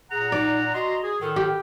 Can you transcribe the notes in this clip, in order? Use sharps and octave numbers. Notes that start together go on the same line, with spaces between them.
A#2 G#4 F#5 A#5
D#4 D5
F#4 D#5 A#5 C6
G#4
A2 D#3 A4
G4